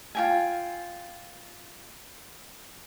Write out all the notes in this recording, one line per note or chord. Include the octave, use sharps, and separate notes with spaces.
F4 G5 G#5